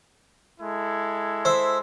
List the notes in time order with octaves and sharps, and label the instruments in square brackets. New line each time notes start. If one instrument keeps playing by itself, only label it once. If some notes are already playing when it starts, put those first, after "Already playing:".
[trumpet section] G#3 E4 A4
[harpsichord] C5 E5